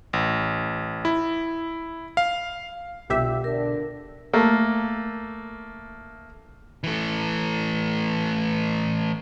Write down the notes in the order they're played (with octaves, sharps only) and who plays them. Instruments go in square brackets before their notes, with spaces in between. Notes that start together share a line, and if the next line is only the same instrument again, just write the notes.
[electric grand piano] A1
E4
F5
[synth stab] C2 G4 E5 [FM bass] B2 [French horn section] D3 B3 F4
[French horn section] D3 D4 [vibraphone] A#4
[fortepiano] A3 A#3
[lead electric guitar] E3 A3